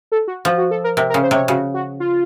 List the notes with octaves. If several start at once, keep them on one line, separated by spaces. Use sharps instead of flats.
A4
F#4
F3 F#4
F#4
A4
A#4
C3 A#4
A#4
C#3
C5
C3 C#5
C#3 F#4
F#4
F4